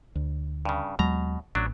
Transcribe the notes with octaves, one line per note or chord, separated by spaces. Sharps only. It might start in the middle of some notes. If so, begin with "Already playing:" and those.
D2
G2 C#3
D#2 B2 F#3 G#3 A#5
A1 F#3 D4